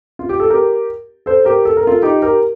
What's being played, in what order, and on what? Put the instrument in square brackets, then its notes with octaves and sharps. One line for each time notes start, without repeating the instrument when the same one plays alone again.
[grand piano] F4
G4
A4
G4 A#4
A4 C5
G4 A#4
A4
A#4
F4 A4
D#4 G4
G4 A#4